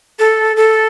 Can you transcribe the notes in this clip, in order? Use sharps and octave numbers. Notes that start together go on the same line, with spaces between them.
A4
A4